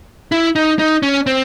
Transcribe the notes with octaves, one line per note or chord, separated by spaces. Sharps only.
E4
D#4
D#4
C#4
C4